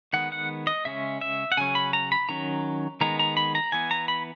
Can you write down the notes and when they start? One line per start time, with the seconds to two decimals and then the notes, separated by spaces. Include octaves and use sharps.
0.13 D#3 G#3 B3 F#5
0.32 F#5
0.67 D#5
0.85 C#3 G#3 C#4 E5
1.21 E5
1.52 F#5
1.57 C#3 F#3 C#4 G#5
1.75 B5
1.93 A#5
2.12 B5
2.29 D#3 F#3 C#4 A#5
3.01 D#3 G#3 B3 A#5
3.19 A#5
3.37 B5
3.55 A#5
3.72 E3 B3 G#5
3.91 A#5
4.08 B5